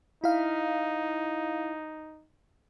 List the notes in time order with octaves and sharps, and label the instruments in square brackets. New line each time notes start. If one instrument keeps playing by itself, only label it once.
[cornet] D#4 [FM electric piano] E4 F5